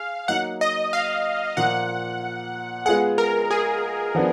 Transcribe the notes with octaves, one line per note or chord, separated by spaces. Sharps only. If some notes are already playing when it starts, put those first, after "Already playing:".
Already playing: G#4 F5
F#3 A#3 D#4 F#5
D#5
F5
A#2 F3 A#3 F#5
G#3 B3 F4 G#4 F#5
A#4
G#4
F3 B3 D4